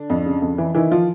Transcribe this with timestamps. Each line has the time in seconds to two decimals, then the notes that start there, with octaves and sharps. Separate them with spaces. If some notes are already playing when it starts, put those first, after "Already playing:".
Already playing: D3 D4
0.10 F2
0.26 C#3
0.42 F2
0.58 E3
0.75 D#3 E3 E4
0.91 F3 F4